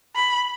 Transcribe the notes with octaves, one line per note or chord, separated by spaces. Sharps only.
B5